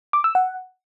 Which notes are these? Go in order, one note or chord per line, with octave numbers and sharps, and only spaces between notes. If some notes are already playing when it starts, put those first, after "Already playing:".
D6
E6
F#5